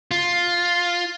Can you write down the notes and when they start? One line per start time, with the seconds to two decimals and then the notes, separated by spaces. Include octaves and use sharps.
0.11 F4